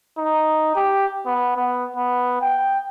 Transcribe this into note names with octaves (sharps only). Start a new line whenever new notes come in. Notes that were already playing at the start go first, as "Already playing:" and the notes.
D#4
G4
B3
B3
B3
G5